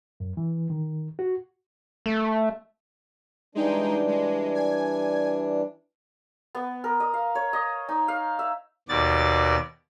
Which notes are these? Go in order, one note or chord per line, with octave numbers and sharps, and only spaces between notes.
F#2
E3
D#3
F#4
A3
E3 G3 G#3 D4 D#4 G5
G#3
G#5
B3
A#4
D#5
F5
C#5
D#5
D#4
F5
E5
D#2 B2 D5 A6